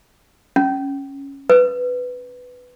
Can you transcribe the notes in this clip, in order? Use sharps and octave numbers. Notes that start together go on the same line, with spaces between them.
C#4
B4